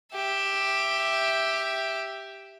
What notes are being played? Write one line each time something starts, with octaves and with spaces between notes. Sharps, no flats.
G4 E5